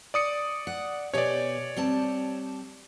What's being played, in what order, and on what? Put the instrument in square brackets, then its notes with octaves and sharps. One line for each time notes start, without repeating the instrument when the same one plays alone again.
[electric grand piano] D5 D#6 C#7
[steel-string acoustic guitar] F#5
[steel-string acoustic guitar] B2 G4 G#5 [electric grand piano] C#5 D5
[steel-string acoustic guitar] G3 C4 A5